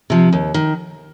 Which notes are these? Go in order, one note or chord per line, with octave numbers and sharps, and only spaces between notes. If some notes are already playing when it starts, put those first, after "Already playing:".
C3 F3
D#2
D#3